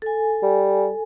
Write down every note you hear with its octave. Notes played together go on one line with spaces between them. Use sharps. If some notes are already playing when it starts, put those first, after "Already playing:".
A4 G#5
G3